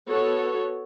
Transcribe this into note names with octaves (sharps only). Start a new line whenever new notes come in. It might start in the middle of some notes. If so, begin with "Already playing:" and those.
B3 F#4 A4 C#5